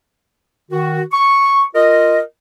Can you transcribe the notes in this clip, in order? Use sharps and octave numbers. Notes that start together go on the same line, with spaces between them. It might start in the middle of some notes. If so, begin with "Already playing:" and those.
D#3 F#4
C#6
F4 A#4 D#5